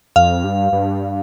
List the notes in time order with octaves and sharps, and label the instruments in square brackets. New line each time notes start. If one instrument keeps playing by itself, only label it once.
[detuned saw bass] F2 [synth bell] F5
[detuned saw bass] G2
G2